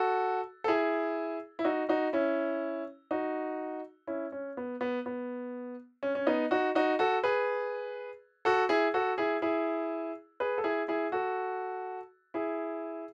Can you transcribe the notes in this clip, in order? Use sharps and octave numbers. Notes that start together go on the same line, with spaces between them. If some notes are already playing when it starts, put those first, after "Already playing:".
Already playing: F#4 A4
A4
E4 G#4
E4
D#4 F#4
D#4 F#4
C#4 E4
D#4 F#4
C#4 E4
C#4
B3
B3
B3
C#4
C#4
B3 D#4
D#4 F#4
D#4 F#4
F#4 A4
G#4 B4
F#4 A4
E4 G#4
F#4 A4
E4 G#4
E4 G#4
G#4 B4
A4
E4 G#4
E4 G#4
F#4 A4
E4 G#4